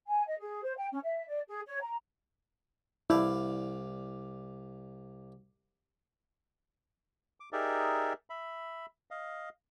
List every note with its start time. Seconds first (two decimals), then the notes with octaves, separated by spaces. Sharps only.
0.06 G#5
0.26 D#5
0.40 G#4
0.62 C5
0.76 G5
0.92 C#4
1.03 E5
1.27 D5
1.47 G#4
1.66 C#5
1.80 A#5
3.10 C2 E4 D5 F5
7.40 D6
7.53 D#4 G4 G#4 A#4 D5 E5
8.30 E5 B5
9.11 D#5 F5